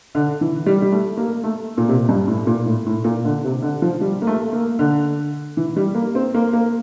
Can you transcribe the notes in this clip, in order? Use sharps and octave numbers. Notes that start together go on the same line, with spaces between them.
D3
E3
G3
G3
A3
A#3
A3
A#2
C3
G2
A2
A#2
A2
A2
A#2
D3
C3
D3
F3
G3
A#3
A3
A#3
D3
E3
G3
A#3
C4
A#3
A#3